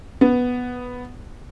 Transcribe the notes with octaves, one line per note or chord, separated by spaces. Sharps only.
B3